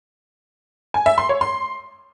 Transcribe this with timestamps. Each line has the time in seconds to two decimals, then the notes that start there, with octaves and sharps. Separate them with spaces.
0.94 G#5
1.06 E5
1.18 C6
1.29 C#5
1.41 C6